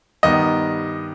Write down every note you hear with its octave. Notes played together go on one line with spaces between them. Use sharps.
G2 D#3 G3 B3 D#5